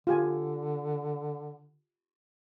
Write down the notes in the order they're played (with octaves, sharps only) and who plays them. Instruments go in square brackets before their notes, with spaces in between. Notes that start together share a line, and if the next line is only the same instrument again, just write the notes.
[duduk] D3 [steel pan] F4 G4 G#5